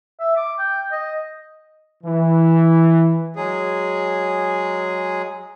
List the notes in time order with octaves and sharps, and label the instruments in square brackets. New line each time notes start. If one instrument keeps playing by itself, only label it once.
[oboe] E5
D6
G5
D#5
[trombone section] E3
[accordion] F#3 G#3 G#4